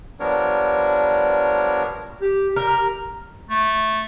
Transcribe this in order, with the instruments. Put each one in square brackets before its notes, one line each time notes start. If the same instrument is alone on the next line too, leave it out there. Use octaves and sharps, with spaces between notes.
[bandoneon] F3 G3 B3 D4 A#4 C#5
[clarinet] G4
[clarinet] G4 [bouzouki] A#4
[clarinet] A3